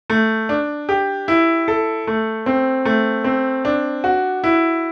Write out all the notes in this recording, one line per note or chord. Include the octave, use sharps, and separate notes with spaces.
A3
D4
G4
E4
A4
A3
C4
A3
C4
D4
F#4
E4